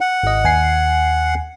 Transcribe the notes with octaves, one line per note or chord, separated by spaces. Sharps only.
F#5
G#1 D#5
D#2 G#5 C7